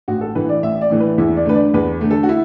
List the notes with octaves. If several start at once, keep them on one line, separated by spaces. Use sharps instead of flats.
A1 F#4
A4
A2 E3 A3 B4
D5
A1 E5
D5
A2 E3 A3
B4
E2 E4
D5
D3 A3 B4
D5
E2 B4
D3 A3
A4
F#4
E4